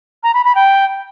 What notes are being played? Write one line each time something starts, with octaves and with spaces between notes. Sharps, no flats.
A#5
B5
B5
G5